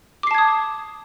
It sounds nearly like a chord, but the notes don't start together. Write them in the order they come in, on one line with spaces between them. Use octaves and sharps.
D6 C7 A5 G#6 D#6